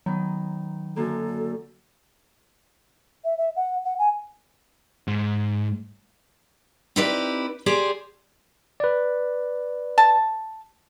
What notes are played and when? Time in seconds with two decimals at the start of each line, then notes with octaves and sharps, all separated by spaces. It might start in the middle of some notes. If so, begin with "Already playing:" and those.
0.06 D#3 F#3 B3
0.96 F#2 D3 A#3 A4
3.24 E5
3.37 E5
3.56 F#5
3.84 F#5
3.98 G#5
5.07 G#2
6.96 C4 D#4 E4 G4 B4 D5
7.66 G4 G#4 C5 D5
8.80 B4 D5
9.98 A5